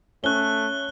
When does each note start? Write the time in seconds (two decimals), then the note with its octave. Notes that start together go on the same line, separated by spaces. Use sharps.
0.24 A3 C#4 F#6 G7